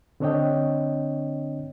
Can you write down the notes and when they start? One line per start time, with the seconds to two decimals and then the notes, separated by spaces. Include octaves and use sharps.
0.20 D3 C4 D4 C#5 D#5 G5